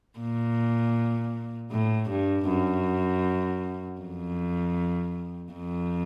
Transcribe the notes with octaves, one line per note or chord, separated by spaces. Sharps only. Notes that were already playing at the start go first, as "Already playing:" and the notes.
A#2
A2
G2
F#2
F2
F2